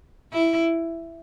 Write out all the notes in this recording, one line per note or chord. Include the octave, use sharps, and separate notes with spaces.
E4